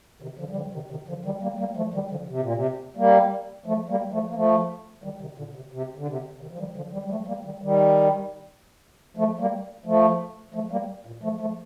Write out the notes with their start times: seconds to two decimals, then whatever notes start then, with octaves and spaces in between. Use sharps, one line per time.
0.22 C3 D#3
0.39 D3 F3
0.51 G3
0.56 D3 F3
0.73 C3 D#3
0.90 C3 D#3
1.08 D3 F3
1.24 D#3 G3
1.42 G3 A#3
1.59 G3 A#3
1.77 F3 A3
1.94 D#3 G3
2.11 D3 F3
2.28 C3
2.41 A#2
2.53 C3
2.97 G3 A#3
3.66 F3 A3
3.89 G3 A#3
4.12 F3 A3
4.29 A#3
4.34 F3 A3
5.04 D#3 G3
5.21 C3 D#3
5.38 A#2 D3
5.55 C3
5.72 C3
5.96 D3
6.07 C3
6.41 C3 D#3
6.51 F3
6.59 D#3 G3
6.76 D3 F3
6.93 D#3 G3
7.05 G3
7.11 F3 A3
7.27 G3 A#3
7.44 D#3 G3
7.62 D#3 G3
9.17 F3 A3
9.39 G3 A#3
9.86 F3 A3
10.54 F3 A3
10.72 G3 A#3
11.06 A#2
11.23 F3 A3
11.41 F3 A3